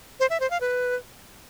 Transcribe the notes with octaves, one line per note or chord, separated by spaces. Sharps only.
C5
E5
C5
F5
B4